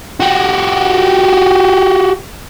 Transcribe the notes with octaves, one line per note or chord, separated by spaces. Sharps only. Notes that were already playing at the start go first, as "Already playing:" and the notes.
F#4 G4